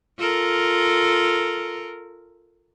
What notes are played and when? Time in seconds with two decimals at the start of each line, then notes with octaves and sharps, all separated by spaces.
0.18 F4 A4 A#4